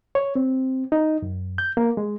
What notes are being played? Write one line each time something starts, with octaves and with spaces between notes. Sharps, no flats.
C#5
C4
D#4
F#2
G6
A#3
G#3